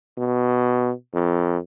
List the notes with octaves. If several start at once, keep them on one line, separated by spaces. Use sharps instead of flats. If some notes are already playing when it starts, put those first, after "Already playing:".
B2
F2